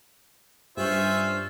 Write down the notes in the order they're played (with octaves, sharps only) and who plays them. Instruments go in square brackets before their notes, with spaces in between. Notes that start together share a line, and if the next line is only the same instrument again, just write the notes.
[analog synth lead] G2 [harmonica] C#4 E5 [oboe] F4 [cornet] C5